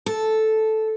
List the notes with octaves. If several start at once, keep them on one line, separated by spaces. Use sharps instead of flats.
A4